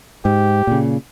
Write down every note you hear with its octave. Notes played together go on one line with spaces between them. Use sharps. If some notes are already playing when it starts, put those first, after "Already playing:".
G#2 G4
A#2 C#3